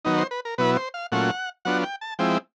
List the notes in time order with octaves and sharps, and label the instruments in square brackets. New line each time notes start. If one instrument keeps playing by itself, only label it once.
[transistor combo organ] D#3 F#3 B3 D#4
C5
B4
A#4
B2 F#3 B3 E4 B4
C5
F5
A#2 F#3 A3 C#4 F4 F#5
F#3 B3 D4 F4 F#5
G5
A5
F3 G#3 C4 E4 G5